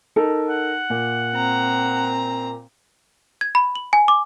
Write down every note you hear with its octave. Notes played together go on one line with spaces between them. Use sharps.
D#4 A4 A#4
F#5
A#2
C4 A#5
G#6
B5
F#7
G#5
D6